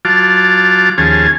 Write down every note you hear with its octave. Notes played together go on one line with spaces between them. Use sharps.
F#3 F4 A5 D6
D#2 F3 C#4 G#4 G#5 A5